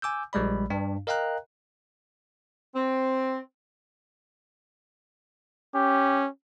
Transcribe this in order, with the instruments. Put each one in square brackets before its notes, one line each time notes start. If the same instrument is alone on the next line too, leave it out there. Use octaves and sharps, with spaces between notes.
[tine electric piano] G#5 D6 E6 G6
A#1 G3 G#3 D5 B5
G2 D4
A#4 D#5 F5 G5 A#5 F#6
[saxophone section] C4
[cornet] C#4 [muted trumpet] G4